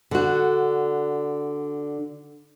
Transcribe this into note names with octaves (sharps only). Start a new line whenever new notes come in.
D3 F#4